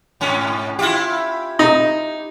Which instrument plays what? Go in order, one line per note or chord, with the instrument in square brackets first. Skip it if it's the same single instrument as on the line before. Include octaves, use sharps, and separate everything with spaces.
[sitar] G#2 C#4
E4 F4 G4
[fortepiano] D#4